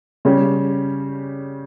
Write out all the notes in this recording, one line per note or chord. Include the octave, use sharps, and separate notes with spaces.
C#3 G3 C#4 G4